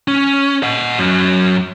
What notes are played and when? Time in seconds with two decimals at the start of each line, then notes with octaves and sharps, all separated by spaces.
0.08 C#4
0.63 D#5 F#5
0.98 F#2 F#3